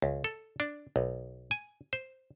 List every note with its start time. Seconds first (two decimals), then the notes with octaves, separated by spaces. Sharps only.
0.02 C#2
0.24 A4
0.60 D4
0.96 B1
1.51 G#5
1.93 C5